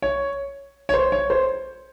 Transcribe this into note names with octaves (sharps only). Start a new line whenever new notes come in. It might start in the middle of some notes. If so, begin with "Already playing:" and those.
C#5
C#5
C5
C#5
C5